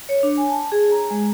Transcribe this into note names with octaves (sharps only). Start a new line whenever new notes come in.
C#5
D4
G#5
A5
G#4
A#5
G#3